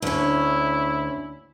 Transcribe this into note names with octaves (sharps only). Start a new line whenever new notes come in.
D2 C#4 E4